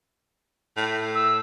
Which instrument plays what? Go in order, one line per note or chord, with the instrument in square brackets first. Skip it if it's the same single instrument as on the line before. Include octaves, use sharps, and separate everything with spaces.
[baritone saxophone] A2
[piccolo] E6